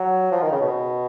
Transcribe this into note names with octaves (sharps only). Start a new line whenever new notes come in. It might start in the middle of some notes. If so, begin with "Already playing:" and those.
Already playing: F#3
F3
D#3
C#3
B2